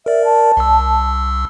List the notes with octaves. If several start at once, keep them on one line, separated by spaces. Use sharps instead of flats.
A#4 D5 E5
A5
C2 E6